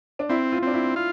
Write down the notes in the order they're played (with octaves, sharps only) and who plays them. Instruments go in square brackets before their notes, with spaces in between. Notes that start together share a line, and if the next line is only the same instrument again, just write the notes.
[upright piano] D4
[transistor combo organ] C4 [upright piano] E4
[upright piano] F4
[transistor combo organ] C4 [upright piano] D4
[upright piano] E4
[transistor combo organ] F4